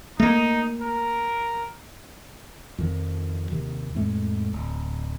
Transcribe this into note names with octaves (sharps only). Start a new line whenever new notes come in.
A3 A#3 D#4
A#4
F2 D#3 F3
D#2 C3 D#3
F2 A2 G#3 A3
D1